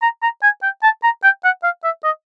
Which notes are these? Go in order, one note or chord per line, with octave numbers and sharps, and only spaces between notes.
A#5
A#5
G#5
G5
A5
A#5
G5
F#5
F5
E5
D#5